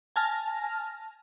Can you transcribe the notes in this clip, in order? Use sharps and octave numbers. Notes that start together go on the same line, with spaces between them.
G#5 A5 F6 A#6